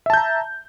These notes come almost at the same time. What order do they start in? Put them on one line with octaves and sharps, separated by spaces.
E5 A5 G6 A#5